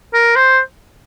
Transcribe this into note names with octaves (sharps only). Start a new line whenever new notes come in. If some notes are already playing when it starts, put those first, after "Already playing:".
A#4
C5